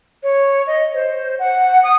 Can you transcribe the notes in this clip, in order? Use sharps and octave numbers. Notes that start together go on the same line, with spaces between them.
C#5
D#5
C5
F#5
D#6